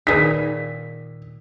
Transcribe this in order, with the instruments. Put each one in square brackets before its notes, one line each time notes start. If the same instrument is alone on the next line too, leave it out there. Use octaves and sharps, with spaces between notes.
[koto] A#2 D#3 [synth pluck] D#4 G#4 B4 [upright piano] B6